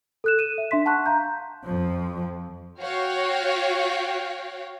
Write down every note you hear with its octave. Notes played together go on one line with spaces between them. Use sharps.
A4 F#6 E7
D#7 E7
E5
D4 E5 C6 B6
F#5 A5 C6 C#6 F#6
F5 A#5 G6
F2 F3
F#4 C#5 F5 G5